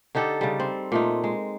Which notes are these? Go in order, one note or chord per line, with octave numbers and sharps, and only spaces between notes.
D3 D#4 G4 A4
C#3 G3
C4
A#2 A3 D#4
G#3